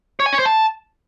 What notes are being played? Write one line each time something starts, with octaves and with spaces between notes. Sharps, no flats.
C#5
G#5
C#5
C5
A5